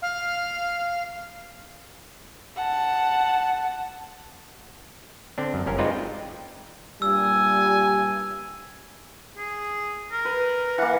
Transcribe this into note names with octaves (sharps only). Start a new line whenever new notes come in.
F5
F#5 A5
D3 C4 D4
F#2
G1 C#4 A#4
G#3 C4 D#4 F4 B4 D5
G5
G2 A#2 G3 G#5 E6
G#4
A#4
B4
E3 A#3 F#5